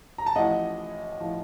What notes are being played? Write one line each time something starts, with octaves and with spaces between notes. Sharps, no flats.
A#5
A5
A1 A2 F3 D#5 F#5
A2 F3